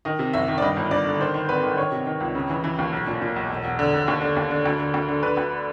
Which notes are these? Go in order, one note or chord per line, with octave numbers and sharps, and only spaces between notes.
D#3 D#5
C3
F#1 E5
D#3
D5
G2 D#5
G1
G2 D5
D3
D#3 C5
D#3
G#1 B4
D#3
D#3 C#5
C3
D#3
C#2
C#3
E3
E3
D#2
B1
A#2
A#2
B1
E1
E1
D3
E1
D#2
D3
D#2
D3
D2
D3
D2
D3
D3 B4
D2